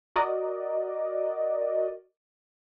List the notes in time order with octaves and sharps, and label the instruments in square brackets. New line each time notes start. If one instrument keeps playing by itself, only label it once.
[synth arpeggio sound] F#4 A#4 D5 D#5